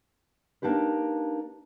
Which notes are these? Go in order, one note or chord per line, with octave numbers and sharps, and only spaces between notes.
A#3 D4 D#4 G4 B4